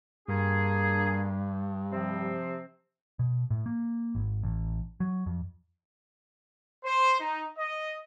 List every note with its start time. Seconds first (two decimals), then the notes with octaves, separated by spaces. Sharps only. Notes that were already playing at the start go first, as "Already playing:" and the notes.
0.28 G2 A#3 D4 G#4
1.92 C3 F3 C4
3.19 B2
3.50 A2
3.66 A#3
4.15 G#1
4.43 A1
5.00 F#3
5.26 F2
6.85 C5
7.20 D#4
7.58 D#5